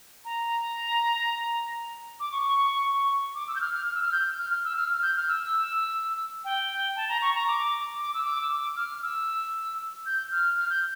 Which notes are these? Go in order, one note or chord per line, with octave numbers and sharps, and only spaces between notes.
A#5
D6
C#6
D6
E6
G6
F6
F6
F6
E6
F6
G6
F6
F6
E6
F6
F6
G6
F6
E6
G5
A5
A#5
C#6
A#5
D6
D6
E6
D6
E6
D6
F6
E6
G6
F6
F6
G6